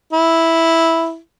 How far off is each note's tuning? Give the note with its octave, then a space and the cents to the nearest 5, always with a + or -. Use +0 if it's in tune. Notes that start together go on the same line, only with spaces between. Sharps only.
E4 -5